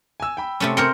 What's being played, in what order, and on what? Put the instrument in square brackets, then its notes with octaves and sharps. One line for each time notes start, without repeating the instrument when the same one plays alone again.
[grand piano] G#5 E6
G5 B5
[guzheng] C3 A3 C#4
[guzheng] C4 A#4 C#5 [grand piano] F6 G6 C#7